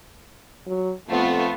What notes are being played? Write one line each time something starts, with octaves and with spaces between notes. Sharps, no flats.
F#3
F2 A3 B3 F4